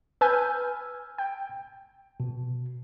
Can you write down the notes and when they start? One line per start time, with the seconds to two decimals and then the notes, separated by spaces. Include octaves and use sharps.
0.21 B4 G#5 E6 F6 G6
1.18 G5
2.20 B2